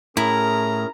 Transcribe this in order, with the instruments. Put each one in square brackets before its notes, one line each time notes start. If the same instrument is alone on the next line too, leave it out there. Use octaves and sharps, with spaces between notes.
[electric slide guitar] A2 [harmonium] C#4 G#4 A#4 [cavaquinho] E4 [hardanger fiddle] A#5